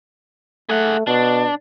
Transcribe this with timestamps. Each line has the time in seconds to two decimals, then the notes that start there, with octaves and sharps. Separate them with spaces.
0.69 A3 G#4 F#5
1.07 B2 D4